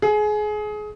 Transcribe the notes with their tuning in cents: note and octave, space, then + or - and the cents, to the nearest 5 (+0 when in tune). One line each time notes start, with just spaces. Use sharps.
G#4 +25